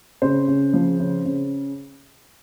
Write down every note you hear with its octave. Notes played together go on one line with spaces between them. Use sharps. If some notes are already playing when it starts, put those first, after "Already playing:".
C#3 C5
C#3
F3
C#3
C#3